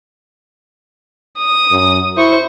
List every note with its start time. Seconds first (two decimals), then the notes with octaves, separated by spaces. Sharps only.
1.39 D#6
1.71 F#2
2.17 E4 C5 C#6